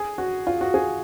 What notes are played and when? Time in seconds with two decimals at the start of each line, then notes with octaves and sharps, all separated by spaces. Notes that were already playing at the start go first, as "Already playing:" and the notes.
Already playing: G#4
0.18 F#4
0.47 F4
0.61 F#4
0.74 G#4